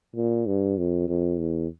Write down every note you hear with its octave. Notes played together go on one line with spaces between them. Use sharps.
A#2
G2
F2
F2
E2